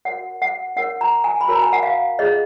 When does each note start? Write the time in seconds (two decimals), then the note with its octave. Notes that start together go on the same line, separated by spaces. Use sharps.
0.05 F#4 A#4 C#5 F#5
0.42 F#5
0.76 D#4 A#4 C#5 F#5
1.01 A#5
1.24 G#5
1.41 B5
1.48 F#4 A#4 C#5 A#5
1.62 G#5
1.73 F#5
1.83 F5
2.19 F4 G#4 C#5 D#5